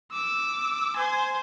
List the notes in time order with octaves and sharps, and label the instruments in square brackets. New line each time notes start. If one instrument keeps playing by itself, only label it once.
[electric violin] D6 E6
C5 G#5